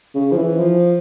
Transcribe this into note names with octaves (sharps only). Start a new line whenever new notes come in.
C#3
F3
E3
F3